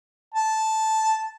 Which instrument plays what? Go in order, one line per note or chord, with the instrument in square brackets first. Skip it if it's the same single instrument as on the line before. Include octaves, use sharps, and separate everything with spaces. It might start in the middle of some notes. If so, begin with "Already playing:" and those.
[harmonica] A5